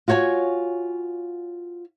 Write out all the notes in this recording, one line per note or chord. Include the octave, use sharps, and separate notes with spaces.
F4 F#4 C#5 G5 G#5